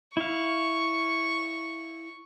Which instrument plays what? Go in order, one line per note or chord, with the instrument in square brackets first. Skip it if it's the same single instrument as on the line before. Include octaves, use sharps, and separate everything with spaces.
[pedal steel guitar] E4 F5 [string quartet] C#6